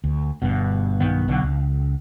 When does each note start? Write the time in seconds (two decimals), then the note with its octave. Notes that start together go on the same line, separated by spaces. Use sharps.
0.04 D2
0.42 G1 G2 B2
1.00 B1 G2 D#3 B3
1.28 B1 B2 D3 F#3
1.43 C#2